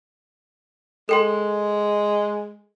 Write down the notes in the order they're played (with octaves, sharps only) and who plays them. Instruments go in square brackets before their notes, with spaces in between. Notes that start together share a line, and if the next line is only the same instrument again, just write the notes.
[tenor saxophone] G#3 [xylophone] A4 G5 C6